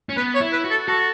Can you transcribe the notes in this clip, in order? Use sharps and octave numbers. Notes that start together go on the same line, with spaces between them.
C#4
B3 B4
C#5
E4
B4
F#4
A4
F#4 A4